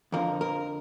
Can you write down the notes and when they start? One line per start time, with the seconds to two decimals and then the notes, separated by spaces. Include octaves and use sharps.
0.12 F2 D3 F3 A#4
0.41 A#4